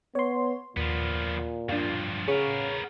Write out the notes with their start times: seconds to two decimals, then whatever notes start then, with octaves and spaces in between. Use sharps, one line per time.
0.15 B3 C#5 C6
0.77 D#2 A#2 F3 B3
1.69 G2 F3 D4 F4
2.28 C#3 B3 G#4 A#4 C#5